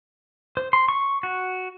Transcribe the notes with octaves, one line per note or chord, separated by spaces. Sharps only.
C5
C6
C#6
F#4